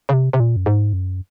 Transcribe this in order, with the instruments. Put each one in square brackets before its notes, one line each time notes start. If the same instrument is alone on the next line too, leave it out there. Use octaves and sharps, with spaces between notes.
[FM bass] C#3
C3
C3
A#2
F#2
G#2
F#2